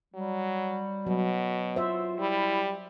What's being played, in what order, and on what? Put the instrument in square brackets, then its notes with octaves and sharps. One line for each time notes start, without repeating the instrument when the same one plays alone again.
[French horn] F#3 [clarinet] G3
[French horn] B2 [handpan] F#3
[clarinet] F4 [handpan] C5 E5
[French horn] G3 [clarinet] E4